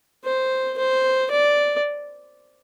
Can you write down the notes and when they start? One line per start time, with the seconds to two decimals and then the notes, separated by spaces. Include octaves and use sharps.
0.25 C5
0.78 C5
1.31 D5